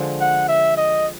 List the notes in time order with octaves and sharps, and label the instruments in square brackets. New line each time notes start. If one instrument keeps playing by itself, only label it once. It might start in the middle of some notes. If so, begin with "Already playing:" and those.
Already playing: [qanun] D3 F3 G#3
[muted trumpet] F#5
E5
D#5